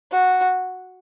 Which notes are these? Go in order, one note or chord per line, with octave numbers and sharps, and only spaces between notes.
F#4